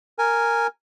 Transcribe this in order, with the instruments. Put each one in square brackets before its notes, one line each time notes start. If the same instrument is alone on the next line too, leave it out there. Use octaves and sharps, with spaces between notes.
[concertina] A#4 G#5